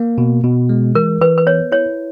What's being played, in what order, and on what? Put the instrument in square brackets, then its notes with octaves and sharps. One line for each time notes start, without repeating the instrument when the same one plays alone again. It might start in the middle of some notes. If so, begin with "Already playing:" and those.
Already playing: [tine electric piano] A#3
B2
B2
G#3
[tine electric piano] E3 [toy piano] A#4
[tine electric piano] E3 [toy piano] B4
[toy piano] B4
[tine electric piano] B3 [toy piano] C#5
[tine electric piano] E4 [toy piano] C#5